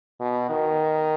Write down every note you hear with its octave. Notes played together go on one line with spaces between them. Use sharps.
B2
D#3